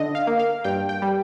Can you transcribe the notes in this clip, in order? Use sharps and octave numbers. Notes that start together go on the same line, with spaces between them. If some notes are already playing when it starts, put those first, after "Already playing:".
Already playing: D3 D#5
F5
A#3
F5
G2 G5
G5
G3